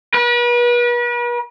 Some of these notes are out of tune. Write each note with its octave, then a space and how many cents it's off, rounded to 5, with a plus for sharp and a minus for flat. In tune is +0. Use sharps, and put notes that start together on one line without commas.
B4 -40